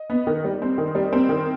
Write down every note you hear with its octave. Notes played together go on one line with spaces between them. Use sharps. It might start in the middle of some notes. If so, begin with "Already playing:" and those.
Already playing: D#5
B3
D#3
G3
C4
D#3
G3
C4
D#3